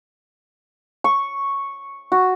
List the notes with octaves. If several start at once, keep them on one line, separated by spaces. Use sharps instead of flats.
C#6
F#4